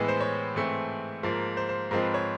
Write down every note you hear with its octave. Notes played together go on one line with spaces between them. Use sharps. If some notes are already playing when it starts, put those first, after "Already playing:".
Already playing: A2 E3 G#3 B3
C5
C#5
G#2 E3 A3 C4
G#2 F3 A#3
C5
C5
G#2 F3 G#3 C4 A#4
B4
C#5